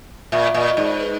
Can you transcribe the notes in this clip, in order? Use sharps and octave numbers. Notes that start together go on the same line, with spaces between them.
A#2 E5
A#2 D#5
D#5
G#2 D5
B4